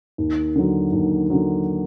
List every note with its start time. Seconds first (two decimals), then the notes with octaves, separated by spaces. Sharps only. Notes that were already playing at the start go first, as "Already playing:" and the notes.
0.18 D#2
0.56 D3 F#3
0.92 D#2
1.30 D3 F#3